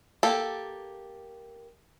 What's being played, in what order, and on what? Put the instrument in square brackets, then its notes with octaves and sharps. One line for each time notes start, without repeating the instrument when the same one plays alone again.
[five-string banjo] A#3 G4 A4